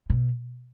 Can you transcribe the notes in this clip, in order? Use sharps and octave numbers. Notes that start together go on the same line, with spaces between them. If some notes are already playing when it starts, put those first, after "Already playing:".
B2